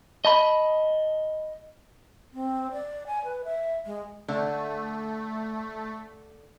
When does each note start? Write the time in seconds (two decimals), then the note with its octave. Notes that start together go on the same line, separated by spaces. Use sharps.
0.25 D#5 A5 B5
2.34 C4
2.72 D5
3.07 G#5
3.24 B4
3.45 E5
3.85 G#3
4.28 D3 A3